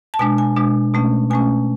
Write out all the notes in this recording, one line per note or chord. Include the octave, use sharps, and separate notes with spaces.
A5
B2 G#3 D4 G#5
G#5
B2 G#3 D4
B2 A3 C#4
B2 A3 C#4 G#5